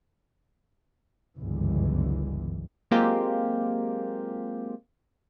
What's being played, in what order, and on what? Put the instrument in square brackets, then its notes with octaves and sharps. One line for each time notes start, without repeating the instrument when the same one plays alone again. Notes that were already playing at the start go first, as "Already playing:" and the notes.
[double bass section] G1 C#2 F#2 D3 E3 G#3
[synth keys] F#3 G#3 A#3 C4 F4 G4